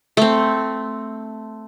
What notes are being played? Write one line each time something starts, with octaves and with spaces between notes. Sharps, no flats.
A3 C4